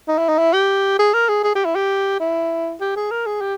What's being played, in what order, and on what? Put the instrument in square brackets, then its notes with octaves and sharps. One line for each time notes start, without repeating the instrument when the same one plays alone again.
[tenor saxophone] D#4
E4
D#4
E4
G4
G#4
A#4
G#4
G#4
G4
E4
G4
E4
G4
G#4
A#4
G#4
G4